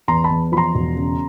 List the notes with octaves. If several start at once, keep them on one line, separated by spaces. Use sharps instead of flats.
E2 A#5 C6
A5 B5
E2
F3 B5
A#5 C6
E1
C#3